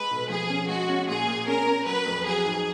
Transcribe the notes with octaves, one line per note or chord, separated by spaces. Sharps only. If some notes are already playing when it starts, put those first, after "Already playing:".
Already playing: G#3 B4
B1
F3 G#4
C#4
G#3 F#4
C#4
A#2 G#4
A#2
C#4 A#4
C#4
F#3 B4
F2
F#3 G#4
G#2